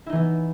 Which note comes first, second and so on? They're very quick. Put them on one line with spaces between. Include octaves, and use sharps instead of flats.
E4 D#4 E3 B3